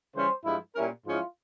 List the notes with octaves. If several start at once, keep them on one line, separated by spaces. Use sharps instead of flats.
C#3 E3 G3 C#4 C5
G2 F3 G#3 E4
A#2 G3 C#4 E4 A#4
G#2 F3 G#3 C#4 E4 F4